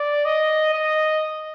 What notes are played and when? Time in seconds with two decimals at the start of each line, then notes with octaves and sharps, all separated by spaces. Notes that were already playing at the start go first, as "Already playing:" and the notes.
Already playing: D5
0.25 D#5
0.74 D#5